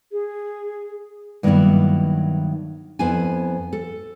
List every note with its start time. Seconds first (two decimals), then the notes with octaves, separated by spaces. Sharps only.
0.11 G#4
1.43 G2 D#3 F#3 A#3 B3 E4
2.99 F2 B3 E4 C5 G#5
3.73 A4